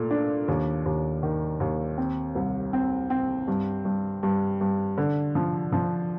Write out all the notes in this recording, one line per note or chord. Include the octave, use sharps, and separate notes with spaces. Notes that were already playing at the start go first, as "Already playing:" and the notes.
Already playing: A#2 A3
D4
D#2
D#2
D#3
D#2
C4
C2
C4
C4
G2
G2
G2
G2
D3
F3
F3